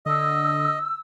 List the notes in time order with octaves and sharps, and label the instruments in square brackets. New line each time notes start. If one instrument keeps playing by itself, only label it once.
[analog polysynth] D3 [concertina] D#5 [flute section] E6